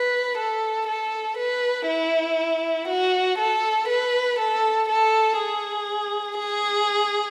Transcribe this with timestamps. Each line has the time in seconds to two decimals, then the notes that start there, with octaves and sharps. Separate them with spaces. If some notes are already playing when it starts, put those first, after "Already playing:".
Already playing: B4
0.38 A4
0.87 A4
1.38 B4
1.88 E4
2.88 F#4
3.39 A4
3.89 B4
4.39 A4
4.89 A4
5.39 G#4
6.39 G#4